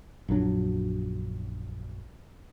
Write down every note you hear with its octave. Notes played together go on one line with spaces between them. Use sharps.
A#1 F#2 F#3 D4